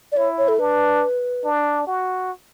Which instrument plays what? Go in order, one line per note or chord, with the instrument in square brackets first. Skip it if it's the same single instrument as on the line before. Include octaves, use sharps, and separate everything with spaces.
[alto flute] D5
[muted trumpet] E4 [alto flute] C#5
[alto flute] C#5
A4
[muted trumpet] D4 [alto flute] B4
[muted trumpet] D4
F#4